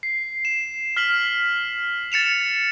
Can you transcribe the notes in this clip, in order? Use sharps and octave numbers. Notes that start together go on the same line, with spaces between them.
C7
E7
F6 B6 F#7
A6 C#7 E7 F7